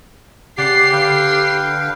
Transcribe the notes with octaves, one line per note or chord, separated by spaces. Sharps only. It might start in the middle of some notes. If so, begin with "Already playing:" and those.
C#3 G4 D5 F#5 C7
D3 B4 F5 G5